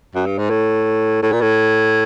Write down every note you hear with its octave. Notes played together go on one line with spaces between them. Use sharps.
F#2
G2
G#2
A2
A2
A#2
A2